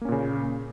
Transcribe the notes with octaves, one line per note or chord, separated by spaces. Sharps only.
A#2 C#3 A#3 C#4